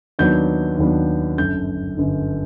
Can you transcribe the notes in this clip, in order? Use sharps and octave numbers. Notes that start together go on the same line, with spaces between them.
D#2 D#3 F#3 B3 D4 G6
D#2 D#3 F#3 B3 D4
G1 F#2 D3 G6
G1 F#2 D3